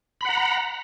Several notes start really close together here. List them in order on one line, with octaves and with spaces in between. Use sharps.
B5 F#5 A#5